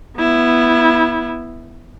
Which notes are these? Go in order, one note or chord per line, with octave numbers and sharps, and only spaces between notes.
B3 E4